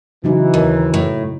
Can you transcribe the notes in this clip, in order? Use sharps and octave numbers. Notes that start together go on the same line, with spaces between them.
C#3 E3 F#3 D#4
D#2
A2